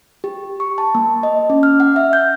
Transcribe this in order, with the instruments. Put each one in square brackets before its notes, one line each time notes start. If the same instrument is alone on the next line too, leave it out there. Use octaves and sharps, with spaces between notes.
[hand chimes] G4
C#6
A5
A#3
D#5
C#4
F6
F#5
E5
G6